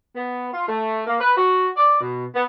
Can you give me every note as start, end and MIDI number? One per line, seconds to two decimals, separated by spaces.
0.16 0.49 59
0.53 0.66 65
0.68 1.02 57
1.07 1.19 58
1.20 1.32 71
1.37 1.68 66
1.77 2.00 74
2.01 2.25 47
2.35 2.44 59